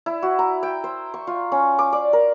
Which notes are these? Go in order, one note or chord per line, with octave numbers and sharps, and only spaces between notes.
E4
F#4
A#5
G5
C5
C#6
F4
C#4
D6
D5
A#4